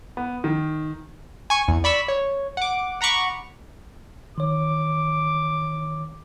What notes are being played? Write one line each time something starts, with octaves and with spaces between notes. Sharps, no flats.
B3
D#3
G#5 C#6
E2
D5 B5 C#6 E6
C#5
F#5 D6
F#5 A#5 B5 C#6 D6
D#3 C#5 D6